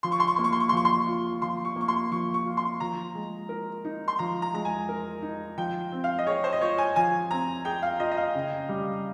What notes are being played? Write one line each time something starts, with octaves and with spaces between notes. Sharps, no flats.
F3 C6
C#6
C6
C#6
A#3 C6
C#6
C6
C#6
C6
F3 C#6
C6
F4
F3 C6
C#6
A#3 C#6
C6
F3 C#6
C#6
F4
C6
F3 A#5
G#3
A#4
D#4
C6
F3 A#5
A#5
G#3 A#5
G#5
A#4
D#4
F3 G5
C4
F5
D#5
G#4 C#5
C5
D#5
F4 C#5
G#5
F3 G#5
C4 A#5
G#4 G5
F5
F4 D#5
D#5
F5
C#3
G3